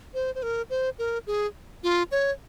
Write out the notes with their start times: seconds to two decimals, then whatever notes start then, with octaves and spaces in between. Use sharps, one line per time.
0.14 C5
0.35 C5
0.43 A#4
0.70 C5
0.99 A#4
1.27 G#4
1.83 F4
2.11 C#5